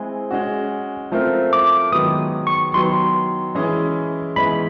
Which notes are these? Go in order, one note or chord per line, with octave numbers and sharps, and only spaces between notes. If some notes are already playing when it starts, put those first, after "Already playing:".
Already playing: G#3 C4 E4 G#4 G#5
G#3 C#4 F#4
F3 A3 C4 F4 A#4
D6
G#2 D#3 F#3 B3 D#6
C#6
D#3 F#3 B3 C6
E3 G#3 C#4 E4 G#4
G#2 E3 G#3 B3 B5